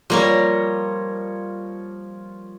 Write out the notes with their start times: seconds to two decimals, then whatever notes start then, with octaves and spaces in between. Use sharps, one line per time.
0.10 F3 G3 A#3 A#4 C#5